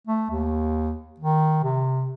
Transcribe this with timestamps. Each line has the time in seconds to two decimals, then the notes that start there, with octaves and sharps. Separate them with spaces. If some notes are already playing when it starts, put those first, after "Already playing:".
0.07 A3
0.30 D#2
1.19 D#3
1.64 C3